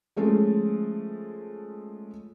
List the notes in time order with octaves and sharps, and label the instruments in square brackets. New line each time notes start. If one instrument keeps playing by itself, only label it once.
[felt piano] F3 G#3 A3 C#4